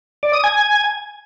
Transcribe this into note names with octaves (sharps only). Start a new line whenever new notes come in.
D5
D#6
G#5